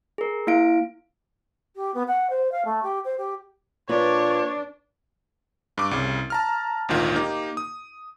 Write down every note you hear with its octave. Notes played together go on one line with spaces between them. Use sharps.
G#4 A#4
A#3 E4 F5 D7
G4
B3
F#5
C5
F5
A3
G4
C5
G4
A#2 D4 B4 C#5
G2 D6
C2 C#3
A5 A#5 F6
G#1 D2 A#2 D#3 F4
A#3 D#4 G4
D#6